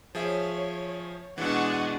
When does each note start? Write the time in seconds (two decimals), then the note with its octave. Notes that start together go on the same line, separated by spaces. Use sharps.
0.15 F3 G#4 C#5 E5
1.38 B2 E3 G#3 D4 F#5 C#6 D#6